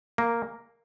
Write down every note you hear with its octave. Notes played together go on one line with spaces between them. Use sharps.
A#3